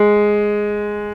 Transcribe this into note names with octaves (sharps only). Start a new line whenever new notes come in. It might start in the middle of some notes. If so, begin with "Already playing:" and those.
Already playing: G#3